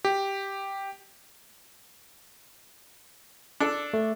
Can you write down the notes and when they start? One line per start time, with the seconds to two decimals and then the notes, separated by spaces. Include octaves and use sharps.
0.05 G4
3.60 D4 A4
3.94 A3